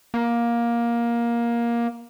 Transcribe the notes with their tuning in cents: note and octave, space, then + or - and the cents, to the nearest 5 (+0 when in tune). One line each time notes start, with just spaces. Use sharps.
A#3 +15